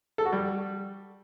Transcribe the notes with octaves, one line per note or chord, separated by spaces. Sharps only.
A4
F#4
G3